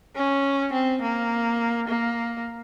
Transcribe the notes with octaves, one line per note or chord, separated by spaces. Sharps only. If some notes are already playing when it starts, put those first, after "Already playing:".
C#4
C4
A#3
A#3